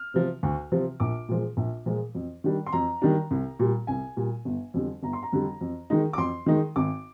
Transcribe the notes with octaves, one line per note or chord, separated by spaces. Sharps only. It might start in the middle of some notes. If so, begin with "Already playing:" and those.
Already playing: F6
C3 F3
D2
C3 F3
A#1 D6
A#2 F3 G#3
A#1
A#2 F3 G#3
F2
D#3 G3 D4
C6
F2 A#5
D#3 G3 D4
C2
A#2 G3
C2 G#5
A#2 G3
G1
F2 D3 G3
G1 A#5
C6
A#5
F2 D3 G3
F2
D#3 G#3 D#4
D6
F2 C6
D#3 G#3 D#4
G#1 D6